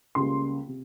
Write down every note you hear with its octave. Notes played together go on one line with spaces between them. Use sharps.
C#2 C#3 G3 A#3 C6
C3